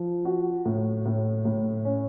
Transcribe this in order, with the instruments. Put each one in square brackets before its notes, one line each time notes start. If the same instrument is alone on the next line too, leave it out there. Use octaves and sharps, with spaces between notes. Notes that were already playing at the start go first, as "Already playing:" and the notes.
Already playing: [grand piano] F3
F#4
A2
A2
A2
C#4